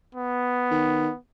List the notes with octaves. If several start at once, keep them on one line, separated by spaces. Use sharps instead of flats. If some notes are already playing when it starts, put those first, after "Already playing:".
B3
D#3